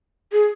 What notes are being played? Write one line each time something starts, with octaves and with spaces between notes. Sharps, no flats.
G#4